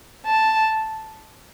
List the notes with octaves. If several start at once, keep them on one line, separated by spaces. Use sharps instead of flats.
A5